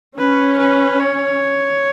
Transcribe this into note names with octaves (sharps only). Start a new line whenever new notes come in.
C#4 B4
B4
C#5